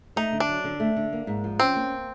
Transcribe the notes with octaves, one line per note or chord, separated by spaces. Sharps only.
A3 D#4
D3
D4
F#3
D3
A3
D3
A#3
G#2
F3
C4 C#4
A#3